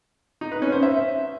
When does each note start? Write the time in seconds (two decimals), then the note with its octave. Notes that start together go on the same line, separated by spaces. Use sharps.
0.41 D#4
0.52 B4
0.62 C#4
0.72 C5
0.83 E5